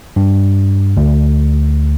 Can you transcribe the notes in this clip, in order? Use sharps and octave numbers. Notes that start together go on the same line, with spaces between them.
G2
D2